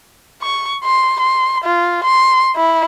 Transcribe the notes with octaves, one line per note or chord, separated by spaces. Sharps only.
C#6
C6
C6
F4
C6
E4